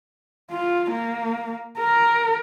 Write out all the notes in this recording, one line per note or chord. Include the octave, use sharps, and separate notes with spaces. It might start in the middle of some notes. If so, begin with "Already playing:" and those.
F4
A#3
A#4